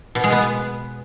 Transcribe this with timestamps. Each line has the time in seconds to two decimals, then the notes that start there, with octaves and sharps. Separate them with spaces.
0.15 B2
0.24 G#3
0.32 B3